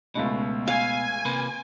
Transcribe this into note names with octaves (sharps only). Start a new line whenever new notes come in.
C#2 B2 A3 D#5
F5 G#5
C3 A#3 B4